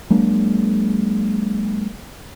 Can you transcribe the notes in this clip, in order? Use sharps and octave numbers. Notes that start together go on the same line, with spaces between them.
F#3 G#3 A#3 D4